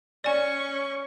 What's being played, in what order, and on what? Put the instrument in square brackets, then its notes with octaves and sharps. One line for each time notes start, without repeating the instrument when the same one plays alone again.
[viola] C#4 C#6 [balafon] D5 G#5